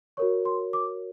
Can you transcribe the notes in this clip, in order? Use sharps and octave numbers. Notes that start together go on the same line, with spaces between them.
F#4 A#4 C#5 C#6
C6
D6